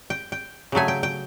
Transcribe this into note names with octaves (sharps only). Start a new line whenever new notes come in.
G5
G5
C#3 F#3 A3 G#5
G5
G5